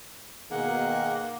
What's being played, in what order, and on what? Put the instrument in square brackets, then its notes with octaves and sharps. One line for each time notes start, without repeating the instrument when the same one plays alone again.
[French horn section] B2 D#3 [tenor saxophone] A#3 [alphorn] G#4 [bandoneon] F#5